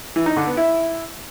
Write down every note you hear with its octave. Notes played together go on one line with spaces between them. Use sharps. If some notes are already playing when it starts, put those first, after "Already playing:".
E3
D#4
D3
B3
E4